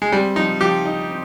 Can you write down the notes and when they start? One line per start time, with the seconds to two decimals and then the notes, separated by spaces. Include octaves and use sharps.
0.02 G#3
0.12 G3 C4
0.36 F3 D#4
0.61 F3 G4
0.85 D#4
1.10 C4